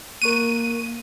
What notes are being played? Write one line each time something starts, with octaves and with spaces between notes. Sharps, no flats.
A#3 A#4 C#6 F#6 D#7